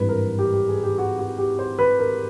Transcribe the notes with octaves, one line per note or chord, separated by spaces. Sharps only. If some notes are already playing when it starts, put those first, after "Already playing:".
Already playing: G#1 G2 E3 G3 B4
A#4
G4
G4
G#4
G4
F#4
F#4
G4
C5
B4
A#4